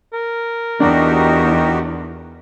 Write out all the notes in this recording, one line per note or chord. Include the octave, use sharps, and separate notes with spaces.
A#4
E2 D4 D#4 F#4 G4